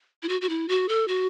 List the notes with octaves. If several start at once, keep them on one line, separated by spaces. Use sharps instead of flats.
E4
F#4
F#4
E4
F#4
A4
F#4